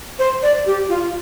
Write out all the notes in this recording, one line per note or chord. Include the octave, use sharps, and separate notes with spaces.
C5
D5
G4
F4